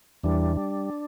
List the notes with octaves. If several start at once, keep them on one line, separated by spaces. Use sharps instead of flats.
E2 E3 G3 D4
G3